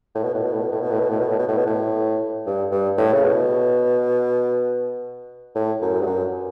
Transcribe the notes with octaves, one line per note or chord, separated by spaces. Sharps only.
A2
B2
A2
B2
A2
B2
A2
B2
A2
B2
A2
B2
A2
B2
A2
B2
A2
G2
G2
A2
C#3
B2
A2
F#2
G2
F#2